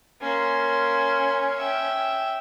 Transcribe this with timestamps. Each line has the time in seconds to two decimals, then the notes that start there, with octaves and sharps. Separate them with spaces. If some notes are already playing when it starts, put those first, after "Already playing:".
0.22 A#3 C#4 C6
1.57 E5 G5